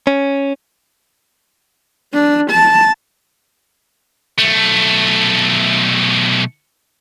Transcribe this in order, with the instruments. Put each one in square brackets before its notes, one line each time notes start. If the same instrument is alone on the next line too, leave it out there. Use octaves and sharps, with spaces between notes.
[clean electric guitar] C#4
[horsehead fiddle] D4
A5
[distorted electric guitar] B1 A3